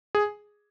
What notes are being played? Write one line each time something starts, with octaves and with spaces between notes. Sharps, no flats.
G#4